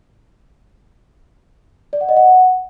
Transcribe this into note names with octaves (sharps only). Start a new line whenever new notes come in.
D5
F#5
D#5
F#5